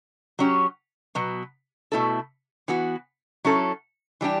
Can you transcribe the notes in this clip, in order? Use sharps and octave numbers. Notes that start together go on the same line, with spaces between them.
F#3 C#4 G4
B2 F#3 B3
B2 A3 E4 A4
E3 B3 F#4
F#3 C#4 E4 A4
E3 G3 D4 G4